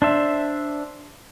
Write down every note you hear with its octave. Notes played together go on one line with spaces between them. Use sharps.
D4 C5 E5